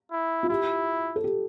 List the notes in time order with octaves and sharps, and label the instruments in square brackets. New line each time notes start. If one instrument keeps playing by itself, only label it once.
[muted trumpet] E4
[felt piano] F4
[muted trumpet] E4 [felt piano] G4
[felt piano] A4
G4